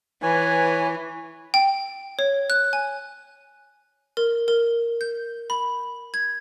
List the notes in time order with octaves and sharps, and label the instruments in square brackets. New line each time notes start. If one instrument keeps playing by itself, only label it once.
[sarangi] E3 [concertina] B4 C#5 G#5
[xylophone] G5
C#5
F#6
G#5
A#4
A#4
G6
B5
G#6